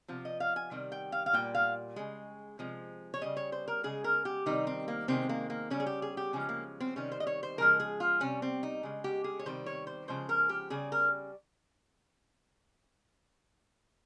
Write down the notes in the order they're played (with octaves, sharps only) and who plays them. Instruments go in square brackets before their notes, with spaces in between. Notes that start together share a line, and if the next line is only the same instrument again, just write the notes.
[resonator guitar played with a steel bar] C3 F3
D#5
F5
G#5
C3 D#3 G3
G5
F5
F5
A#2 G3 G5
F5
C#3 G#3
C3 F3 G#3
C#5
C#3 G3 D#5
C#5
C5
A#4
C#3 G#3 G#4
A#4
G4
C3 D#3 G3 D#4
C4
A#3
C3 D#3 G#3 C4
A#3
A#3
C#3 G3 C#4
G#4
G4
G#4
G4
C#3 F3 G#3 C#4
A#3
C4
C3 D#3 G3 C#4
C5
D#5
C#5
C5
C#3 F3 G#3 A#4
G#4
F4
C3 G3 C#4
C4
D#4
C#3 G#3
G4
G#4
C#5
C3 D#3 G3 C5
C#5
C5
C#3 F3 G#3 C5
A#4
G4
C#3 G3 G#4
A#4